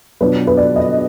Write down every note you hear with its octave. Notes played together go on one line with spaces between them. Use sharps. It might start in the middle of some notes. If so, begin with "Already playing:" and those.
B2 F#3 D4 F4 B4
B4
D5
D#5